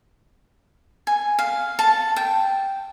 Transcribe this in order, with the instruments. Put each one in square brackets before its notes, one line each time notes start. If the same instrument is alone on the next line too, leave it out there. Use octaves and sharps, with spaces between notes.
[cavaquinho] G#5
F5
A5
G5